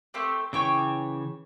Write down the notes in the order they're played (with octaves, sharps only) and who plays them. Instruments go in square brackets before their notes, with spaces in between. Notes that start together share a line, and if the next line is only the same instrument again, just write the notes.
[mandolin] A3 C4 G4
[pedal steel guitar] C#3 E3 C#5 [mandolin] G5 C#6 D6